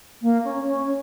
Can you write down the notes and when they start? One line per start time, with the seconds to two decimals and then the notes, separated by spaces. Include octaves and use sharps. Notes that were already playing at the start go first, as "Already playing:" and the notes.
0.22 A#3
0.44 C#4
0.67 C#4